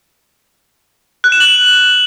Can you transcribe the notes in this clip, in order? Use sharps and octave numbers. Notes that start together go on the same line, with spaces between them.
F#6
E7
F#7
E7